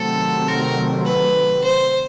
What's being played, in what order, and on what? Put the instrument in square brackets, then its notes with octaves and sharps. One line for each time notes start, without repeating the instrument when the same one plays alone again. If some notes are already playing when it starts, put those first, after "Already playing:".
Already playing: [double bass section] C3 D#3 F#3 A3 C4 [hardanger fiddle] A4
[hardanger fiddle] A#4
B4
C5